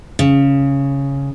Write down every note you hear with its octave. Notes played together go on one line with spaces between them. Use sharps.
C#3